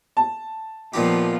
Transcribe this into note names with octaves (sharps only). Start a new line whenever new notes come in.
A5
A#2 F3 B3 D#4 F4 G4